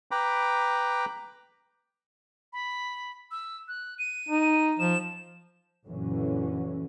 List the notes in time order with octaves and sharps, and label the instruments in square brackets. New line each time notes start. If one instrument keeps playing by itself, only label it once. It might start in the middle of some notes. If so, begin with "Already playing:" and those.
[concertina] B4 G5 A#5 B5 D6
[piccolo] B5
E6
F#6
D#7
[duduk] D#4
[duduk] F3 [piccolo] E7
[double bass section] F#1 A#2 D3 E3 F#3 C#4